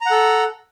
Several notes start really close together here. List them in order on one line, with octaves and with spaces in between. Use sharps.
A#5 F#5 A4